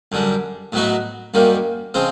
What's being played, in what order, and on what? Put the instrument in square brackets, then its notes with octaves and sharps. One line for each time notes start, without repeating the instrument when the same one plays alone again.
[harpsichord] F#2 D3 G3
A2 F#3 B3 D#4 F#4
F#2 D#3 G3 A#3
C#3 F3 G#3 C4